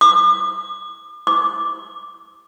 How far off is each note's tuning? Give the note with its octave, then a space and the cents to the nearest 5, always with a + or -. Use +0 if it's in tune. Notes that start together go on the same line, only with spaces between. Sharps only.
D6 +40
D6 -5